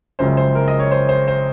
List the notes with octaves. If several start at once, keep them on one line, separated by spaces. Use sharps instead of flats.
F#1 F#2 C#3 F3 G#3 C5
C5
A#4
D#5
C#5
C5
C5
C5